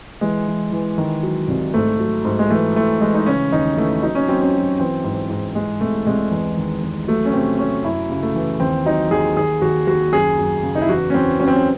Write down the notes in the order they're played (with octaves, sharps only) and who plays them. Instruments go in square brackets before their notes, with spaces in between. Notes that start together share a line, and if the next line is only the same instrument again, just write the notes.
[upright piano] E3 G#3
E3
E3
D#3
F#3
C2
G#2 A3
F#3
G#2
G#3
E3 A3
E3 A3
E3 G#3
D#4
C#3 C#4
D#2 D#4
E3 A3
F#3 D#4
C#4
F#3 C4
C#4
F#3
E3 C4
G#2
G#2
E3 G#3
C2 A3
C2 G#3
E2
D#3
E2
F#3 A3
C#4
C3 C4
F#3 C#4
F#2 E4
C#3
A3
E3
D#2 C4
F#3 D#4
D#2 G#4
D#2 G#4
D#2 F#4
D#2 F#4
F#2 G#4
F#2
C#3
D#4
E4
E2 F#4
C#4
E2 C4
F#3 C#4
C4
C#4